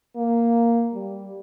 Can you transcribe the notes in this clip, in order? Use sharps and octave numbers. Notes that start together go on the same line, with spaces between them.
A#3
G3